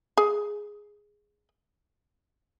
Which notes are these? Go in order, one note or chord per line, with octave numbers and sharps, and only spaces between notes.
G#4